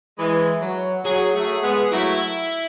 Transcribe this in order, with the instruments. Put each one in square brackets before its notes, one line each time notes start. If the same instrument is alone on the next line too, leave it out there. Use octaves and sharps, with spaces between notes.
[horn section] E3 G#3
F#3
[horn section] F#3 [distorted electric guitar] G#4
[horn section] F#3 A3
G#3 B3
[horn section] F#3 A3 [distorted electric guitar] E4